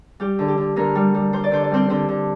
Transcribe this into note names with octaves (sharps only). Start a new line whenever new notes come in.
G3 G4
D3
G4
D3
D3 A#3 A#4
G3
G3
G3 C5
D5
D3 C5
D5
G3 C4 C5
D3 C4 C5
D3